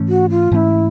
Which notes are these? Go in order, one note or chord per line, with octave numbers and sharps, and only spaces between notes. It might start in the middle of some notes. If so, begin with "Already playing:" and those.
Already playing: G#2 E3 A3 C#4
F#4
F4
G#2 E3 A3 C#4 E4 F4